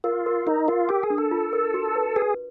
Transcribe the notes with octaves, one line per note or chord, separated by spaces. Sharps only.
F4 A#4
A#4
D#4 A#4
F4 A#4
G4 A#4
G#4
D4
A4
F4
A#4
F#4
B4
G#4 B4